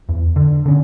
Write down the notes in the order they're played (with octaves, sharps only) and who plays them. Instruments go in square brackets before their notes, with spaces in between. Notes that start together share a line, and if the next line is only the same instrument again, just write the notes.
[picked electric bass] E2
D3
D3 C#4